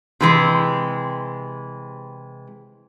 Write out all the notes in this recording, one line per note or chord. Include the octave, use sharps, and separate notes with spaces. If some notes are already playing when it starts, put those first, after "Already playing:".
C3 E3 G#3